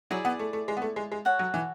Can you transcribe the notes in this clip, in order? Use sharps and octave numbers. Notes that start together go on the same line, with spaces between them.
F#3 E4 G#4 D5
B3
A3
A3
G#3
B3
A3
G#3
G#3
F#4 A4 C#5 F#5
F#3
E3